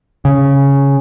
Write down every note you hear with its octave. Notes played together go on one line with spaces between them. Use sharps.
C#3